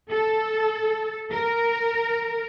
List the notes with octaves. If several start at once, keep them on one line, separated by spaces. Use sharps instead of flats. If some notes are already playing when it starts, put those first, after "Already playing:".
A4
A#4